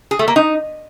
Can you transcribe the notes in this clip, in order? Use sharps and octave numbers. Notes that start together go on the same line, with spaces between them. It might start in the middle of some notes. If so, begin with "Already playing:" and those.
G#4
A3
A#3
D#4